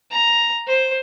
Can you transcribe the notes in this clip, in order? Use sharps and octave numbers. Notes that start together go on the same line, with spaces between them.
A#5
C5